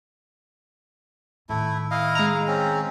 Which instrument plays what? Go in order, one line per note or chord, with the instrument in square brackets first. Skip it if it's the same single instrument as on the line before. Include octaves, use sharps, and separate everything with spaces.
[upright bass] A2 D#3 [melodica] A3 E4
[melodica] E4 D#5 F5
[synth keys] G#3 A#5
[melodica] C4 C#4